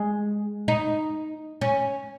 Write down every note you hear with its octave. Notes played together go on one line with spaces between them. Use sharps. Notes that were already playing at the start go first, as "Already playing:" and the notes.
Already playing: G#3
D#4
C#4